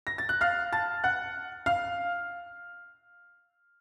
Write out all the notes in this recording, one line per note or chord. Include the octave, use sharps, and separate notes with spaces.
A#6
A6
F#6
F5 F6
A5 A6
F#5 F#6
F5 F6